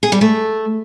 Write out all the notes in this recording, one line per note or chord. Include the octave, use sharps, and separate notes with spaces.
G#4
G3
A3